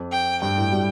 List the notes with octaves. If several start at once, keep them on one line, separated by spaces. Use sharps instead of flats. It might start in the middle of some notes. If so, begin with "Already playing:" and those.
Already playing: F2
G5
G2 G5
A2
G3